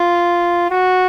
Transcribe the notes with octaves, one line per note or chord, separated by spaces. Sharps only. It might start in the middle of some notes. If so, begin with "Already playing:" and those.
Already playing: F4
F#4